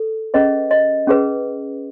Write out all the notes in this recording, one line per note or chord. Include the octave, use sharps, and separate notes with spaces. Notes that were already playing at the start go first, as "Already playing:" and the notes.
Already playing: A4
C#4 G#4 B4 D#5
D#5
C#4 G#4 B4